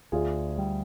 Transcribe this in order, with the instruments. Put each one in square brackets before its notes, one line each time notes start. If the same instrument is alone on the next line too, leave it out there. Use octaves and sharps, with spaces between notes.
[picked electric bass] D2 [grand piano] F4 G#4
[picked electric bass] G3